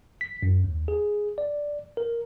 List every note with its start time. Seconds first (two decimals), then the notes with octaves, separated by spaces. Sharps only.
0.21 B6
0.43 F#2
0.64 D#2
0.88 G#4
1.38 D5
1.97 A#4